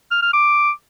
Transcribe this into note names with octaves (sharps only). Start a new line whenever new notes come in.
F6
F6
D6